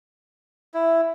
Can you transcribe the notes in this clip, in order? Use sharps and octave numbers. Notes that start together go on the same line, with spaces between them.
E4